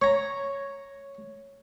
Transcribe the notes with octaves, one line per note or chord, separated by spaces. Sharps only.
C#5 A#5